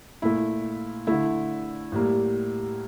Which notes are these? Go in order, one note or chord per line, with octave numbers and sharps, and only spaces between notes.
A#2 A3 E4
D3 A3 E4
A2 G3 A#3